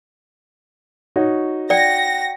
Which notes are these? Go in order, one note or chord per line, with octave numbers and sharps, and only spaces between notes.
D#4 F#4 C#5
D5 F#5 G5 A#6 C#7